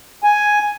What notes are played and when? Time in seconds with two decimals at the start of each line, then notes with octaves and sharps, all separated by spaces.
0.24 G#5